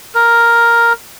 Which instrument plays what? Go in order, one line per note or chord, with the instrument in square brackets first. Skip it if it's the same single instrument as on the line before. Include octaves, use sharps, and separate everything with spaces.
[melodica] A#4